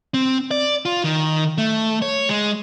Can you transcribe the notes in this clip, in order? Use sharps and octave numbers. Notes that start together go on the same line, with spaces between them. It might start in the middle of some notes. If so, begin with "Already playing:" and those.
C4
D5
F4
D#3
A3
C#5
G#3